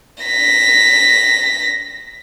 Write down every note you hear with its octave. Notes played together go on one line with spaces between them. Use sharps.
A#6 B6